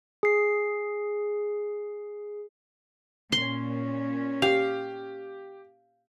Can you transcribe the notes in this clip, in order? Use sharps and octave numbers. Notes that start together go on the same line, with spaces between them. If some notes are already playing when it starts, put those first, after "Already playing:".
G#4 C7
A#2 C#4 C6
G4 F5